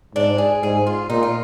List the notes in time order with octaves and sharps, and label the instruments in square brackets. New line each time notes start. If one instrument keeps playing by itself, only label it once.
[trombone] G#2 [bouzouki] D4
[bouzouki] G#4
[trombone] G#2 [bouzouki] G#4
[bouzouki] F4
[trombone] A#2 [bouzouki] D#4
[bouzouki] F4